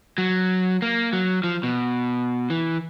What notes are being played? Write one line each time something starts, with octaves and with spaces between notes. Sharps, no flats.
F#3
A#3
F#3
F3
B2
E3